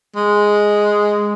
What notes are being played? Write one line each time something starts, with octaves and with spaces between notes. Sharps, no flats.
G#3